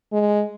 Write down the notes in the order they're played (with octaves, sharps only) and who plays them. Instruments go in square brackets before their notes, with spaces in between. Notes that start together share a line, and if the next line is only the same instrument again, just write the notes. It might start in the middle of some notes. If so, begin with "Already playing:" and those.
[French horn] G#3